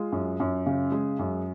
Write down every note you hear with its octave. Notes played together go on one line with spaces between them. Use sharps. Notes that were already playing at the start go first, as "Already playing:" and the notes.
Already playing: G#3 F4
F#2
F#2
C#3
G#3
F#2